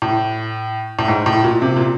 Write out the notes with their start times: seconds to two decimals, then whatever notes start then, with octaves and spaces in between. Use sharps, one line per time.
0.02 A2
0.99 A2
1.08 G#2
1.26 A2
1.44 A#2
1.62 C3
1.77 A#2